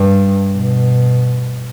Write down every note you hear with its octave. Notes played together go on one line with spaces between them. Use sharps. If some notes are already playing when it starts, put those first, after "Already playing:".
Already playing: G2
B2